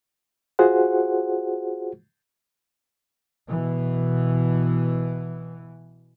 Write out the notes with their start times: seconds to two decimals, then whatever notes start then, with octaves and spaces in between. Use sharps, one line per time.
0.59 F4 F#4 G#4 C5 F#5
3.47 B2 E3